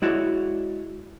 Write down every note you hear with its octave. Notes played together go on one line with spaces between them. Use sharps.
G#3 E4 F#4 C#5 D5